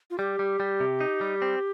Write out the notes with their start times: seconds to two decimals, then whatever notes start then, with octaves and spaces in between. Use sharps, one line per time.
0.11 F4
0.19 G3 G4
0.39 G3
0.60 G3
0.80 C3
1.01 D#4
1.21 G3
1.42 C4